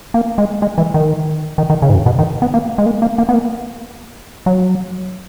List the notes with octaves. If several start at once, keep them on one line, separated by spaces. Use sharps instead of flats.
A#3
G#3
G#3
E3
D#3
D#3
D#3
C#3
G#2
F#2
B2
D#3
B3
A#3
G#3
A#3
A#3
A#3
B3
A#3
F#3